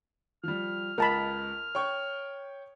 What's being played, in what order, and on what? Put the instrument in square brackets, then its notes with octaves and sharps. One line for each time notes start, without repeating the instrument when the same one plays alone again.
[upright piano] F3 G3 [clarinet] F6
[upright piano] C#2 D#5 [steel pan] A#4 A5 B5
[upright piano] C#5 G5 C#6